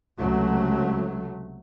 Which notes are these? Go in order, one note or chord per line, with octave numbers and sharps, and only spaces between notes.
C#2 C3 F#3 A3